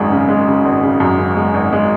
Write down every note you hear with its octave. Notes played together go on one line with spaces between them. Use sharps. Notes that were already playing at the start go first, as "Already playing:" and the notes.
Already playing: G#1 F#2 G#3
C#3
G#3
C#3
G#1
C#3
F#2
C#3
G#3
G#1
G#3